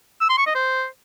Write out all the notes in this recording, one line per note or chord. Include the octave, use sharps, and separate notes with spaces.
E6
C6
C#6
D#5
C5